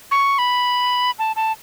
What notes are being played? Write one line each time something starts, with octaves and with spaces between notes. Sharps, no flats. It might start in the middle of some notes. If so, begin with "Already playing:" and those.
C#6
B5
A5
A5